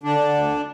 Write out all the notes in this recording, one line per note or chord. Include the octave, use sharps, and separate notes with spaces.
D3 D4
D3
D2